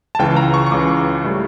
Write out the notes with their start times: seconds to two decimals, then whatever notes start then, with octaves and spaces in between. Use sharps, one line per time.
0.15 A5
0.19 C#2 C#3 E3 G5
0.36 A#5
0.54 C#6
0.66 C#6
0.71 C#2 C#3 E3 D6
1.24 A2 G3